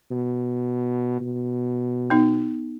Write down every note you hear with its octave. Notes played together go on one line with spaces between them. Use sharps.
B2
B2
B3 D#4